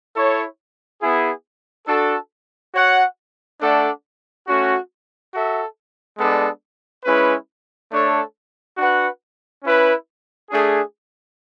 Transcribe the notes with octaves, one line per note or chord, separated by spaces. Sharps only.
E4 A4 C#5
B3 E4 G#4
D4 F#4 A4
F#4 C#5 F#5
A3 D4 A4 D5 F#5
A3 C#4 F#4
F#4 A4 E5
G#3 B3 D4 A4 D5
G#3 C#4 E4 B4
A3 D4 A4 C#5
D4 F#4 B4 F#5
C#4 E4 B4
A3 D4 G#4